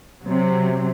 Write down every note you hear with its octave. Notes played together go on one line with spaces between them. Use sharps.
C3 F#3